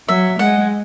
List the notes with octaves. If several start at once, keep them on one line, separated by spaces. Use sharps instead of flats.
F#3 E5
G#3 F#5